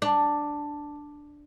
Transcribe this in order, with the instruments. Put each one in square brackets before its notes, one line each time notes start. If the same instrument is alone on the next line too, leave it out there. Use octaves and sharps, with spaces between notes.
[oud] D4